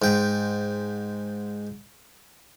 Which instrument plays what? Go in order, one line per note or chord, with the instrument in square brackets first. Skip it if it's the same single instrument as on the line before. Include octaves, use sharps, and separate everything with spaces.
[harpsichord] G#2 G5